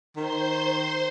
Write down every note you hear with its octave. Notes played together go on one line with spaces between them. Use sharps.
D#3 C5 C6